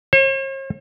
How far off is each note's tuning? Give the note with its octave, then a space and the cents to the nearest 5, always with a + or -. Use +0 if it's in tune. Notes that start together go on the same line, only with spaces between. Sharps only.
C#5 -45